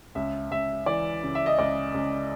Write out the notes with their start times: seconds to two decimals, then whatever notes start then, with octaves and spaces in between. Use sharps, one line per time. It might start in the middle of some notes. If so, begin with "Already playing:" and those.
0.15 C#2 E5
0.51 C#2 E5
0.86 E3 D5
1.23 C#3
1.35 E5
1.46 D#5
1.59 C#2 D5
1.94 C#2